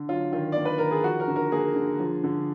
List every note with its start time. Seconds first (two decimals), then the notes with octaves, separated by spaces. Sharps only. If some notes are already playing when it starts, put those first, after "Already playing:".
Already playing: D3
0.09 F#3 F4
0.33 D#3 F4
0.52 A#3 D5
0.65 B4
0.78 D#3 A#4
0.91 G#4
1.04 F3 F#4
1.20 A#4
1.28 D3
1.36 A#4
1.52 A#3 G#4
1.76 D3
2.00 F3
2.24 D3